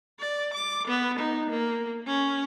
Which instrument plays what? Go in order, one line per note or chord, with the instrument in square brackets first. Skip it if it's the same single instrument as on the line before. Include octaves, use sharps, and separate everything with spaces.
[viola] D5
D6
B3
D#4
A#3
C#4